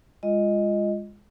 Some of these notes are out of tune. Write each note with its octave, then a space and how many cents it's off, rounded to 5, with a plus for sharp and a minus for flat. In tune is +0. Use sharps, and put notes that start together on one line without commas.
G#3 -20 F4 +0 D#5 +0